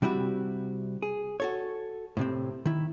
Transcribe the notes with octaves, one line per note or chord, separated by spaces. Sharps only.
C3 G3 C4 E4 F#4
G#4
F#4 A4 C#5
A2 C3 C4
D#3 E4